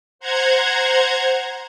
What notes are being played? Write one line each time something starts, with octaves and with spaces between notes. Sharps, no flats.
C5 F#5 A#5 G#6